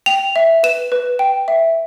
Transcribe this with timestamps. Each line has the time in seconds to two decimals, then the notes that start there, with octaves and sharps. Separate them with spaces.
0.06 G5 F7
0.36 E5
0.63 B4 E7
0.92 B4
1.19 G5
1.48 E5